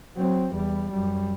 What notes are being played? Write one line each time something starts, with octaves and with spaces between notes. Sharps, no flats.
F#3 C4
E2 G3
F#2 G3